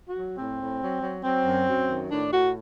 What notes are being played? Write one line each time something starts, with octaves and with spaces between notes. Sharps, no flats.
F#4
F#3
A2 C4
A2
F#3
F#3
F#3 C4
F#2
F#2
D#3
A2 D4
A2 F#4